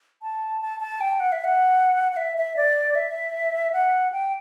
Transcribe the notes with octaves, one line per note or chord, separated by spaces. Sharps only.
A5
A5
A5
G5
F#5
E5
F#5
F#5
E5
E5
D5
E5
F#5
G5